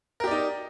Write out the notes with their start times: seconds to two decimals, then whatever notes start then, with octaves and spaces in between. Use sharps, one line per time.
0.20 A#4
0.24 G4
0.27 D5
0.31 D#4